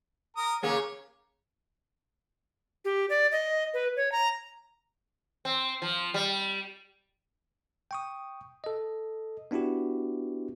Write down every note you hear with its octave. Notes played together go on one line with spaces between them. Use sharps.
A#4 D#6
C#3 A#3 G#4 C#5
G4
D5
D#5
B4
C#5
A#5
C4
F3
G3
G5 C#6 D#6
A4 D#5
B3 D4 E4 F#4 G4